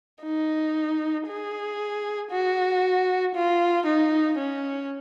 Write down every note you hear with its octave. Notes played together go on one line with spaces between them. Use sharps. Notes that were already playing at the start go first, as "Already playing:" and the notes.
D#4
G#4
F#4
F4
D#4
C#4